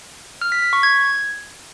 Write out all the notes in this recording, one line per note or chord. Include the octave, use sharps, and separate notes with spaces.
F6
B6
B6
C#6
G#6